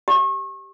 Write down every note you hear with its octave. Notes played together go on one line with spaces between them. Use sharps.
G4